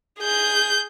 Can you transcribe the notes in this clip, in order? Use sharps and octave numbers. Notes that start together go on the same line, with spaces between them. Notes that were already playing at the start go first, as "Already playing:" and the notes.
G#4 G6